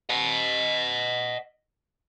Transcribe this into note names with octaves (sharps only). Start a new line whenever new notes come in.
D#5 F#5